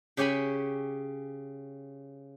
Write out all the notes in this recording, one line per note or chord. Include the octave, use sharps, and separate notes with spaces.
C#3 G4 C#5 G#5 B5